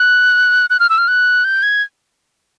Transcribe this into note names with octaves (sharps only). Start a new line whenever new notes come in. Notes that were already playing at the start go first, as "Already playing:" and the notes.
Already playing: F#6
F#6
F6
E6
F6
F#6
G6
G#6